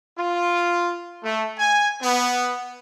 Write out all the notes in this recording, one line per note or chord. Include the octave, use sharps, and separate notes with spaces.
F4
A3
G#5
B3